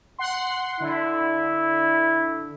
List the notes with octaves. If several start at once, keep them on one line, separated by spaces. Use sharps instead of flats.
F#5 C6
D3 E4